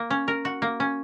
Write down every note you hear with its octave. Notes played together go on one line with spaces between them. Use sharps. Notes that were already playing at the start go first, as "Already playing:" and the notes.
Already playing: A#3
C#4
A#4
F#4
A#3
C#4